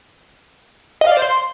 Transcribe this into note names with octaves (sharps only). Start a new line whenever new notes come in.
D#5
F5
D5
C5
C6